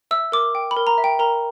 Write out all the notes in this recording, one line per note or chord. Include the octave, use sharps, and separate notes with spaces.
E5 E6
A#4 D6
G5
B5
A#4
A#5
E5
G5
A#4 A#5